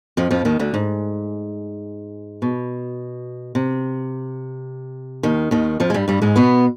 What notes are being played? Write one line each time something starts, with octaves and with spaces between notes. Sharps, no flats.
F2 F3
F2 F3
D#2 D#3
D2 D3
G#2
B2
C3
D#2 D#3
D#2 D#3
F2 F3
G#3
G2 G3
G2 G3
G#2 G#3
B2 B3